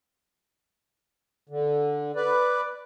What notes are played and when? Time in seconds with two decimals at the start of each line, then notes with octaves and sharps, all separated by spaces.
1.49 D3
2.16 B4 D5